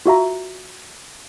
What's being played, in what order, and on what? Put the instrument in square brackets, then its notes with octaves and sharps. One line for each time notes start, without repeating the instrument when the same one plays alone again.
[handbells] F4 F#4 E5 A#5